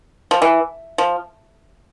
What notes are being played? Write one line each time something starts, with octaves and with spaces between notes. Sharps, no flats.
F3
E3
F3